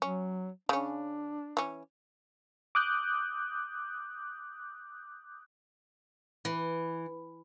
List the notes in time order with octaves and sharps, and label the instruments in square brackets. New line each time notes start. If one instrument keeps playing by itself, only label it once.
[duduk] F#3 [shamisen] C#4
[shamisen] C#3 C#4 [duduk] D4
[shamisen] E3 C#4
[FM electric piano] D6 D#6 F#6 G6
[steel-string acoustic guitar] E3